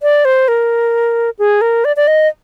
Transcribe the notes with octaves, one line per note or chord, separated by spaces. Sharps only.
D5
C5
A#4
G#4
A#4
D5
D5
D#5